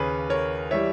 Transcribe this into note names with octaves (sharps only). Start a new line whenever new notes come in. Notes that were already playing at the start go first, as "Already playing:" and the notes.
Already playing: D#2 C#3 G#4 B4 C#5
A#4 C#5
E3 G3 C#5 E5